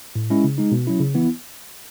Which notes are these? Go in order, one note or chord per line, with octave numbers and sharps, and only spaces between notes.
A2
G#3 C#4 E4
C#3
G#3 D#4
B2
F#3 C#4 E4
C#3
E3 B3 E4